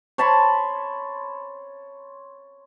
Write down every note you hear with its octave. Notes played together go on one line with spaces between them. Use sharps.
C#5 A5 B5 C6